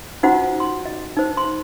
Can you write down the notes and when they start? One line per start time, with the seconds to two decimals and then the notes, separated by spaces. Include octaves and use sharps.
0.23 C#4 D#4 F4 F#4 C5 F#5
0.60 C6
0.85 D#5
1.17 D#4 C5
1.37 C6